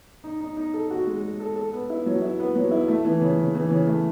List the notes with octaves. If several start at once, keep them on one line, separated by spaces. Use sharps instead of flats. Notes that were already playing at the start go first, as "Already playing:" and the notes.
D#4
D#4
D#4
A4
F#4
G#3
G#3
A4
A4
B3
E4
F#3
E4
B3
F#3
E4
A3
E3
C#3
C#3
E3
C#3
A3